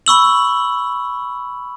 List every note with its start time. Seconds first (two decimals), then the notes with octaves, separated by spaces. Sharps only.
0.06 B5 C#6 E6 F#7